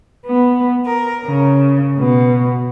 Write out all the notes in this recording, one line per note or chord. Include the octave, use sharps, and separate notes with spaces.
B3
A#4
C#3
B2